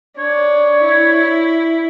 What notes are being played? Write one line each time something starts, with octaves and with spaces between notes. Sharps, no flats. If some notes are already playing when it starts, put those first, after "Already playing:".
D4 C#5
E4